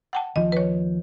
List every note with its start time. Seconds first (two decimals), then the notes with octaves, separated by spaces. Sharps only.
0.13 F#5 G5 A5
0.36 D#2 F3 D#5
0.52 B4 C#5